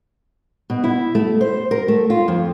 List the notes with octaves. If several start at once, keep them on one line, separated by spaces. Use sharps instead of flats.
B2
E4
A3
C5
A#4
A3
F4
F2